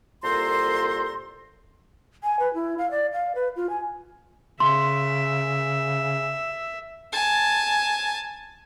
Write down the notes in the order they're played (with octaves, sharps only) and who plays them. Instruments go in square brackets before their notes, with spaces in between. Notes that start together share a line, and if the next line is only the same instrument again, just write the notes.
[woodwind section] C2 A#2 A4 C5 A#5 C6
[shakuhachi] G#5
B4
E4
F5
D5
F5
B4
F4
G#5
[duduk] C#3 [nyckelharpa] E5 [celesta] C6
[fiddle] G#5 A5